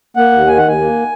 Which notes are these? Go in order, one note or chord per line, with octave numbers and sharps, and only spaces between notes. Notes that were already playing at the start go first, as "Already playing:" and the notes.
A#3 F#5
D#2
D#3 G#5
F#5
D#2 G#5
A#3